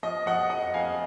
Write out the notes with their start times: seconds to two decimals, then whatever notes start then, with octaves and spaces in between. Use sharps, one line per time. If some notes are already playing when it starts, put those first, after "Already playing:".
0.03 F3 D#5
0.26 F3 D#5 F#5
0.50 F2 D#5 F#5
0.74 F2 F5 G#5